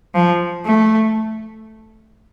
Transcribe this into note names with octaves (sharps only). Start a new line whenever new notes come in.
F3
A3